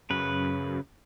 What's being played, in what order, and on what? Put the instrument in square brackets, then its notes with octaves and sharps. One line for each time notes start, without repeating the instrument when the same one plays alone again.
[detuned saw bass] F#2 [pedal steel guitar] C#3 B4